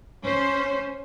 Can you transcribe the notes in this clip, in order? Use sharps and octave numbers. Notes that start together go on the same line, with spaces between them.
C#4 C5